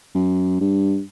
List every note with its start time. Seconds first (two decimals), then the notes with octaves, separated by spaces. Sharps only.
0.14 F#2
0.60 G2